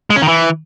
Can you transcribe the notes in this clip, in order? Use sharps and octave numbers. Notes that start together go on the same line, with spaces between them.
G#3
C#4
D#3
E3